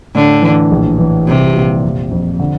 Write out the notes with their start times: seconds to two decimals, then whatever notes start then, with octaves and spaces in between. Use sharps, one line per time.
0.15 A2 D3
0.42 E3
0.71 A#1
0.99 E3
1.27 C3 G3
1.56 A#2
1.84 F1
2.11 F2
2.39 D3